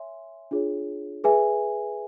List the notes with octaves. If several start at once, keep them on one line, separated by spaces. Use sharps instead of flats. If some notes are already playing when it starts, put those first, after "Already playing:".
Already playing: C#5 E5 G#5 C6
D4 F4 G#4 C#5
G#4 B4 E5 G#5